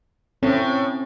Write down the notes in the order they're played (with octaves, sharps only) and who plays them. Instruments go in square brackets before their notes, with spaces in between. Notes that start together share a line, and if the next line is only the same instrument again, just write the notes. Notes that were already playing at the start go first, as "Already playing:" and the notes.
[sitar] A2 [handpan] C4 C#4